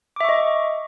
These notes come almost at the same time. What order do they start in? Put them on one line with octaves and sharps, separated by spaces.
D6 E5 C#6 D#5